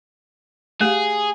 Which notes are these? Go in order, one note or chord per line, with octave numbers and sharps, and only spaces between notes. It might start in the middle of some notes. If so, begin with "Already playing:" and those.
A3 G4 G#4 F5